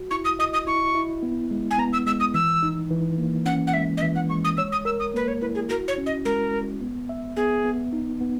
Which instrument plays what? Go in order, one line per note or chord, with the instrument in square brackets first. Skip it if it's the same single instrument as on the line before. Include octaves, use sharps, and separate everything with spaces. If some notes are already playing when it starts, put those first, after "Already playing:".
Already playing: [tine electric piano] F#4
[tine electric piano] E4 [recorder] C#6
[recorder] D#6
[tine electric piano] D#5 [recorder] D#6
[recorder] D#6
[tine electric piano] E4 [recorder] C#6
[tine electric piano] E4
B3
G#3
[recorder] G#5
[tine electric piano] B3 [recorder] A#5
[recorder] E6
[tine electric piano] G#3 [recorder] E6
[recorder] D#6
[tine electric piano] E3 [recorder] E6
[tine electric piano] D#4
E3
A#3
[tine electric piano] C#4 [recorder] F#5
[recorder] F#5
[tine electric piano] G#3 [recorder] E5
[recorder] D#5
[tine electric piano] E3 [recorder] E5
[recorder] F#5
[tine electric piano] G#3 [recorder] C#6
[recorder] D#6
[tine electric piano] C#5 [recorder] E6
[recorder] D#6
[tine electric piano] A#4 [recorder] E6
[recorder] D#6
[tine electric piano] A#3 [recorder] B4
[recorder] C#5
[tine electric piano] E4 [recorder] B4
[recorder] G#4
[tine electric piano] F#4 [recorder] A#4
[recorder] C#5
[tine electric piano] C#4
[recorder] D#5
[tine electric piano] G#3 [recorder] A#4
[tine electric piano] G#3
B3
E5
[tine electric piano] B3 [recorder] G#4
[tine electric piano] B3
D#4
B3